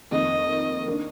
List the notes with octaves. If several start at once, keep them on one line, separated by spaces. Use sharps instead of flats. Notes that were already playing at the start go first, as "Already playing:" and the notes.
F2 D#3 A#3 D#5
D#3 A#3 D4